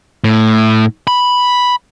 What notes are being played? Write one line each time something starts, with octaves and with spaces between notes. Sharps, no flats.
A2
B5